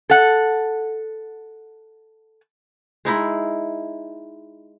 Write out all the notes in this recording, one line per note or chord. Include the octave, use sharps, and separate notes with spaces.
A4 F#5
G#3 D#4 E4